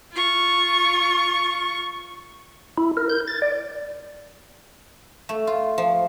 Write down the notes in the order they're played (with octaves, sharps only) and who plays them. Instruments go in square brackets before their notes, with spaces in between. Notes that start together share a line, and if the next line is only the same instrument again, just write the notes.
[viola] F4 C#6
[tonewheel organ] E4
A#4
G6
A6
D5
[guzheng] A3
F4
F3